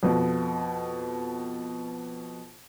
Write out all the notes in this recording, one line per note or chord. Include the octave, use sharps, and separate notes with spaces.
F2 B2 F3